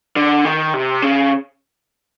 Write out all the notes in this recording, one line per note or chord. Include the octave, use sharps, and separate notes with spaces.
D3
D#3
C3
C#3